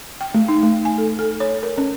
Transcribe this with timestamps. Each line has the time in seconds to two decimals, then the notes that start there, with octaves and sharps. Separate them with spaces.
0.21 G5
0.34 A3
0.48 D#4
0.63 A3
0.85 G#5
0.98 A4
1.19 A4
1.40 C#5
1.63 A#4
1.78 C#4